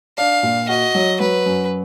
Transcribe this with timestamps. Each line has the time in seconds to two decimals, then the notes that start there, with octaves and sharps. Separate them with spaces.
0.17 D4 F5
0.43 A#2
0.69 F#4 D#5
0.95 F#3
1.20 F#3 B4
1.46 F#2